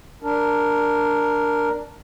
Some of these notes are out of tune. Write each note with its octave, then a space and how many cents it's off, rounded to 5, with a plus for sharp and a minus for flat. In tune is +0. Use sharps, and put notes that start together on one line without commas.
D4 +0 A#4 +0